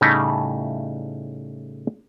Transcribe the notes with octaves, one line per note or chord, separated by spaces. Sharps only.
A2 C#3 G3 A3 D#4 E4